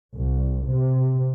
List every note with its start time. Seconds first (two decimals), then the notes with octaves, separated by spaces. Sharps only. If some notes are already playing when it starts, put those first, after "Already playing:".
0.13 C2
0.67 C3